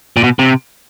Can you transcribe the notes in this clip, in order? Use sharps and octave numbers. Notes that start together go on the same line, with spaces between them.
A#2
B2
C3